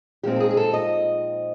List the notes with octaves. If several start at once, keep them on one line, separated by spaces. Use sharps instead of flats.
A#2 F3 G#3 C4 D#4 G4
A4
G#4
G#4
A4
D#5